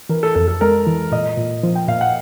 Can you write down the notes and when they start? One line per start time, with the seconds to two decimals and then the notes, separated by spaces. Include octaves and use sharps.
0.09 E3 A#4
0.23 A4
0.35 F2 A4
0.48 A4
0.61 G#3 A#4
0.87 E3
1.12 A#2 D#5
1.37 A#2
1.63 F3
1.75 G5
1.88 A#2 F5
2.01 F#5